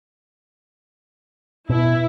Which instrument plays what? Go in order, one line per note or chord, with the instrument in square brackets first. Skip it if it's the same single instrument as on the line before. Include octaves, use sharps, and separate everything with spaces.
[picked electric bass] B2 [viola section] E4